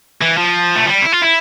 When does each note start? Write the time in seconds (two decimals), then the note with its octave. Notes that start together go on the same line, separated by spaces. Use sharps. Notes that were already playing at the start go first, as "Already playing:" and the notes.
0.22 E3
0.38 F3
0.76 A3
0.87 G3
1.02 E4
1.12 F4
1.22 E4